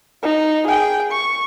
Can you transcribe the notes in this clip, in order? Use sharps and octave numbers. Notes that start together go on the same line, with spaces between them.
D#4
G#4 G5
C#6